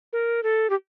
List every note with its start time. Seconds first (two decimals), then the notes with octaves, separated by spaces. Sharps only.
0.13 A#4
0.43 A4
0.70 G4